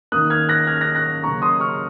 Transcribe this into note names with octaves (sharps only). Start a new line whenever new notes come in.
D#3 A#3 D#6 F#6
F6 G#6
F#6 A#6
F6 G#6
F#6 A#6
F#6 A#6
C#3 F#3 A#3 A#5 C#6
C6 D#6
C#6 F6